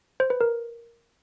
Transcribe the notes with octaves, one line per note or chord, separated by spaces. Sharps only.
C5
B4
A#4